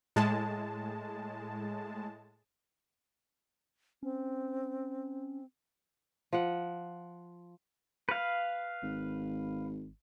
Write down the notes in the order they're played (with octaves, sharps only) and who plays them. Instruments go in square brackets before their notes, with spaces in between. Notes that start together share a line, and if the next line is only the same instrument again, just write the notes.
[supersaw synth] A2 G#3 A5
[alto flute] C4 [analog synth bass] C#4
[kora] F3 F#5
[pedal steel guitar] B4 F5
[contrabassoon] G#1